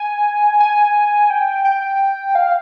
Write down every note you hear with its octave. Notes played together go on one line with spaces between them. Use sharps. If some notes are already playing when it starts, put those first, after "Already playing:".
Already playing: G#5
G#5
G5
G5
F5